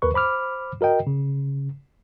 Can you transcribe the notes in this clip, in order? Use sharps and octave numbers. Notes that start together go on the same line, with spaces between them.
D#2 A#4 B4 C#6
C5 B5 D6 F6
F#4 A#4 D#5 G5
C#3